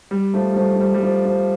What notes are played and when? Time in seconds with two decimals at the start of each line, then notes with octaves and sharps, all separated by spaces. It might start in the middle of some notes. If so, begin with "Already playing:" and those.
0.11 G3
0.34 F3 A3
0.53 G3
0.57 F3 A3
0.76 F3
0.80 G3
0.94 G3
1.03 F3
1.25 F3